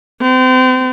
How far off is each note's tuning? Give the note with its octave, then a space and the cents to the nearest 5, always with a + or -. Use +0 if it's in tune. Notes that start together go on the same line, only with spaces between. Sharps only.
C4 -35